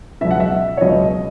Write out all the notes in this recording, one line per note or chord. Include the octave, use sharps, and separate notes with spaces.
C#2 B2 F#3 E5
F#5
E5
C#5
C#2 B2 F#3 D#5